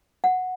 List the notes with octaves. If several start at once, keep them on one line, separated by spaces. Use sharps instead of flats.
F#5